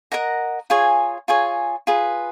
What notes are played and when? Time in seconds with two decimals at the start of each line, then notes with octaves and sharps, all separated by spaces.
0.12 A#4 D#5 F#5 A#5
0.70 F4 G#4 C#5 G#5
1.28 F4 G#4 C#5 G#5
1.87 F4 G#4 B4